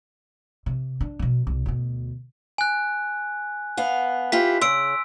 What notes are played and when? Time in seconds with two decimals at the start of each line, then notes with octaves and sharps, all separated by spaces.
0.66 C3
1.01 D4
1.19 B2 F#3
1.47 C2
1.66 D2 B2
2.58 G#5 F#6
3.77 B3 F5
4.32 E4 F4 G4 B6
4.61 C#3 C6 E6 D7